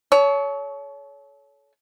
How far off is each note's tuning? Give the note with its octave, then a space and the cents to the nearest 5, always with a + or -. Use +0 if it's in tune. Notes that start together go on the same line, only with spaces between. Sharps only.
A4 -35 C#5 +20